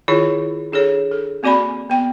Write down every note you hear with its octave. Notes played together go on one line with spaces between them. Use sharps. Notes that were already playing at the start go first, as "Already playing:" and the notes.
D#3 E4 F4 G#4 C#5
D4 G#4 A4 C#5
A4
A#3 C4 F#4 D5 G#5 B5
B3 G5